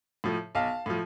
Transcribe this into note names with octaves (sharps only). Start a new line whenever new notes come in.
A2 F3
B1 F5 A5
A2 F3